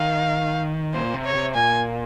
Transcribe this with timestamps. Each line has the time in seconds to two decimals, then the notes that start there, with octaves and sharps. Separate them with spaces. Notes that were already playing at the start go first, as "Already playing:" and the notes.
Already playing: D#3 F5
0.94 A#2 C5
1.14 C3
1.25 C#5
1.34 C3
1.54 A#2 G#5